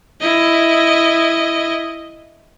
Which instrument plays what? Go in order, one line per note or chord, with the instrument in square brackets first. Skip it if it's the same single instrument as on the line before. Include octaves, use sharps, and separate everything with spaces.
[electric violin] E4 D#5